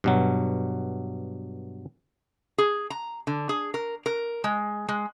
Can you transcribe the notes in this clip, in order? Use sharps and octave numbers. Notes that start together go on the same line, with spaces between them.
G2 B2 F#3
G#4
A#5
D3
G#4
A#4
A#4
G#3
G#3